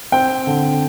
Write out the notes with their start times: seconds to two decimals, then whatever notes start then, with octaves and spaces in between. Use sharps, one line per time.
0.12 C4 G5
0.47 D3